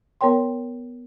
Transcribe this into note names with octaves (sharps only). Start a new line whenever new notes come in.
B3 A#4 C#5 G5 C6